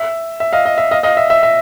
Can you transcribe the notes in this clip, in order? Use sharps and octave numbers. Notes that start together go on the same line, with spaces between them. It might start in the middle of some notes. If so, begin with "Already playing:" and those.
Already playing: E5
E5
D#5 F5
D#5
E5
D#5 F5
D#5 F5
E5
E5
E5